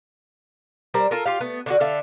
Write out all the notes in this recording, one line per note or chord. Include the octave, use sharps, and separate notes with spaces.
G3 A#4 C5
F4 A4 A#4
F4 G4 F5
A3 B3
D3 F4 F#4
D3 A4 E5 F5